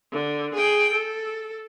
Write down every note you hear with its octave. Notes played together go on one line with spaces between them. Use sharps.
D3
G#4 G5
A4